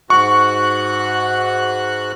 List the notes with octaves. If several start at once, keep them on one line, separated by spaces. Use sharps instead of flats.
G#2 F#4 C#6 F#6